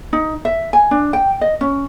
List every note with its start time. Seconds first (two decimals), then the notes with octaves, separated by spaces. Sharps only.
0.13 D#4
0.45 E5
0.73 G#5
0.91 D4
1.13 G5
1.41 D#5
1.61 C#4